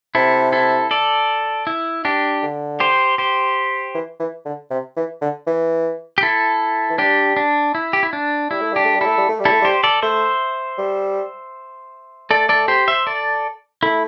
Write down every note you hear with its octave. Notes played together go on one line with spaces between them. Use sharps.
C3 E4 A4
E4 A4
A4 D5
E4
D4 G4
D3
G4 C5
G4 C5
E3
E3
D3
C3
E3
D3
E3
G4
E4 A4
E3
G3 D4 G4
D4
E4
G4
E4
D4
G3 E4
A3
G3 D4 G4
A3
G3
A3 E4 A4
G3
A3
G3
E4 A4
A3
G3 G4 C5
A4 D5
A3 C5 E5
G3
A3 A4 D5
A4 D5
G4 C5
C5 E5
A4 D5
A3 E4